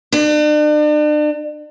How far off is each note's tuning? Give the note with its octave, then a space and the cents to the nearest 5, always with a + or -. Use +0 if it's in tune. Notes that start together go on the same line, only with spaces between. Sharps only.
D4 +40